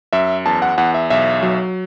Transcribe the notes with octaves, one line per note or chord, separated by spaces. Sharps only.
F#2 E5
E2 A5
F#5
E2 F#5
E5
B1 E5
F#3